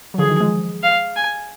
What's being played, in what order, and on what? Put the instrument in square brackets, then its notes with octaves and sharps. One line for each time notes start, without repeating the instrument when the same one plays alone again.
[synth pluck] F#3
[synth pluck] D3 F3 [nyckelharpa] G#4
[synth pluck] D#3 F#3
F3 G#3
[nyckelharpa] F5
G#5